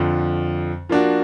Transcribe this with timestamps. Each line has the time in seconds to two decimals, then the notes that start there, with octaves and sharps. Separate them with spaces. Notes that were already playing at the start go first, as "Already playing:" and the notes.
Already playing: F2 D3 F3
0.89 F3 A#3 D4 F#4